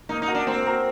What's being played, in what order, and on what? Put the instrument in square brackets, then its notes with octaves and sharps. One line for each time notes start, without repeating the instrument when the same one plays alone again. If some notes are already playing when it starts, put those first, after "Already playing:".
[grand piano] A#3 [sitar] D#4
[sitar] D#4
[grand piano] F#4 A#4
[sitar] D4
[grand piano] A#3 [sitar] C4
[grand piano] F#4 A#4